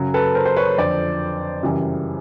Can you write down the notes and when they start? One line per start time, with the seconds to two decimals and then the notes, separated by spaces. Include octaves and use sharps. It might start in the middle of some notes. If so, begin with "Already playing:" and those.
Already playing: F#2 C#3 F#3
0.14 A4 B4
0.35 A#4 C5
0.46 C5
0.56 B4 C#5
0.78 F2 D3 F3 C5 D5
1.63 F#2 C#3 E3 G3